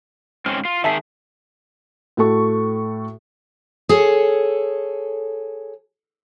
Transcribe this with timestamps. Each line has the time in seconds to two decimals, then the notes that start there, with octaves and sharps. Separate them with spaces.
0.46 G#2 C4 C#4 F6
0.65 F4
0.84 D#3 G#4 E5 A5 B6
2.17 A2 F#4 A4 C#6
3.89 G#4 A4 C#5